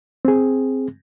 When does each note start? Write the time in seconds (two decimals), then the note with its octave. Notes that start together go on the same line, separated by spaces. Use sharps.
0.25 C4 G#4